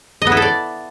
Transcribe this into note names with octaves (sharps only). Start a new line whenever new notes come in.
D#5
B3
E4
A4
D5